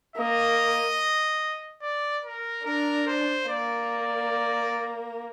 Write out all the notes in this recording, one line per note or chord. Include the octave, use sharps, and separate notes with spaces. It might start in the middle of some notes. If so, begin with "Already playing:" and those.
A#3 D#5
D5
A#4
D4 A#4
C5
A#3 D5